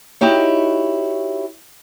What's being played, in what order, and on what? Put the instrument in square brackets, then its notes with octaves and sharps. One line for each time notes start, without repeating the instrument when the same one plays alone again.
[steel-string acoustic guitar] D#4 E4 F#4 G4 C#5